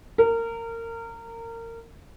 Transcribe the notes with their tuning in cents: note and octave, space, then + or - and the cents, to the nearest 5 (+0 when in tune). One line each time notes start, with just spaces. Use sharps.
A#4 -25